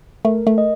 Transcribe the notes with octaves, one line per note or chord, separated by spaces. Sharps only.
A3 A#4
A3
D#5